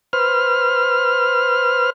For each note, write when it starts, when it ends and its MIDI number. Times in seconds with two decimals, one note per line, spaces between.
0.13 1.90 71
0.13 1.90 72
0.13 1.90 89